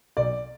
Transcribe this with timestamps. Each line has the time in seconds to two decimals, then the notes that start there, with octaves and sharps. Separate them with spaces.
0.17 B1 B2 D5